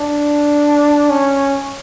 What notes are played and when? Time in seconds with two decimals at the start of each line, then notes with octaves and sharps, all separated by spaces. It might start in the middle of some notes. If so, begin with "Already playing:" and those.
Already playing: D4
1.10 C#4